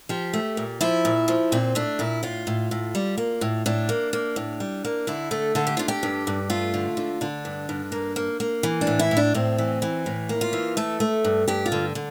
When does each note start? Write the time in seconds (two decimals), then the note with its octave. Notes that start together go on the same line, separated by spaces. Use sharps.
0.09 F3 G4
0.33 A3
0.57 A#2
0.81 F3 E4
1.05 A#2
1.28 F3
1.52 A#2 C4
1.75 A3 D4
1.99 A#2 E4
2.23 A2 F4
2.47 A2
2.71 A2
2.95 G3
3.18 A#3
3.41 A2
3.66 A2 D4
3.89 A#3
4.13 A#3
4.36 A2
4.60 G3
4.85 A#3
5.07 D3 E4
5.31 A3 A4
5.55 D3 A4
5.67 G4
5.77 D3 F4
5.88 G4
6.03 G2
6.27 G2
6.50 A3 F4
6.74 D3
6.97 D3
7.21 D3 D4
7.45 G2
7.69 G2
7.92 A#3
8.16 A#3
8.40 A#3
8.63 E3
8.81 D4
8.87 A2
8.99 E4
9.11 A2
9.17 D4
9.34 A2 C4
9.58 E3
9.82 E3
10.06 A2
10.29 A#3
10.41 F4
10.53 E3
10.77 A3 A4
11.00 A3
11.25 G2
11.48 G2 G4
11.66 F4
11.72 D3
11.95 D3